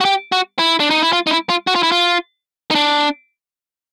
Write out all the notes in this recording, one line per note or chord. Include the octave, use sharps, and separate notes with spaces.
F#4
G4
F#4
E4
D4
D#4
E4
F4
D#4
E4
F4
F#4
F4
E4
F4
D#4
D4